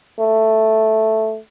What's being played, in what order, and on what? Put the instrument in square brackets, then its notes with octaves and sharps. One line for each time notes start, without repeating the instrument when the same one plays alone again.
[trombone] A3